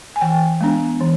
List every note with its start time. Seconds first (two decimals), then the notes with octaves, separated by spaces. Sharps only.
0.16 G#5
0.21 E3 G5
0.61 G#3 B3 D4
1.00 E3